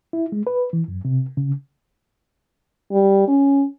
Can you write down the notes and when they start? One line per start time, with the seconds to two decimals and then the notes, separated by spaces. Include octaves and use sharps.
0.13 E4
0.32 G#3
0.47 B4
0.73 E3
0.88 F#2
1.05 C3
1.37 C#3
2.92 G3
3.27 C#4